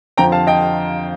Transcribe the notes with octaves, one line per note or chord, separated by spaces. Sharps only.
F2 D3 F3 G5 A#5
F5 A5
D#5 G5